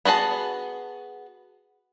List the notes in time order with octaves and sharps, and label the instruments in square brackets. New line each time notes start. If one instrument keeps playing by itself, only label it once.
[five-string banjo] B3 F#4 G#4 A5